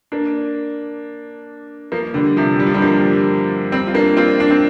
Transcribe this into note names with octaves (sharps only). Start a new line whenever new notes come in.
A#3 D4
F3 A#3
D3 G3
C3 F3
G3
F3
D3 G3
F3 A#3
G3 C4
F4
A#3 D4
C4 F4
D4
C4